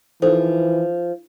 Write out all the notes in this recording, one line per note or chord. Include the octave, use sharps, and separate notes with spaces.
E3 F3 D#4 A4 C5